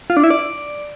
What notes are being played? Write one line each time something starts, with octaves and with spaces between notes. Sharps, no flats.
F4
D4
E4
D5